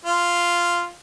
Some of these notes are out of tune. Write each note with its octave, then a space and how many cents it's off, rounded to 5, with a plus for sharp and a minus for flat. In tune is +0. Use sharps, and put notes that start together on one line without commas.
F4 -5